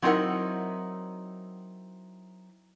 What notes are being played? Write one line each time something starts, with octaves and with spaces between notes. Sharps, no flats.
F#3 C4 D#4 E4 A#4 F#5